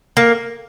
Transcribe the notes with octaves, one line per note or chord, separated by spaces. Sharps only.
A#3